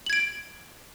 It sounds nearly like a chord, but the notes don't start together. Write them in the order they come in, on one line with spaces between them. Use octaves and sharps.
F#7 G#6 D7